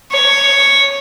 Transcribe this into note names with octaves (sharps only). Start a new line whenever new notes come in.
C#5